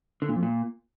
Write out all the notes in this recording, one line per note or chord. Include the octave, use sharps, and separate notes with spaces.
D3
A#2
F2
A#2